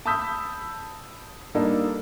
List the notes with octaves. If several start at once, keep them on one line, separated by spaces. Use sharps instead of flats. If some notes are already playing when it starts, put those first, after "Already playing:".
A5 B5 D#6 E6 G6 B6
G3 A#3 D4 D#4 A4 A#4